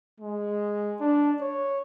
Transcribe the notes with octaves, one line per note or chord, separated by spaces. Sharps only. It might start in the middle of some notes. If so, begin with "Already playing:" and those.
G#3
D4
C#5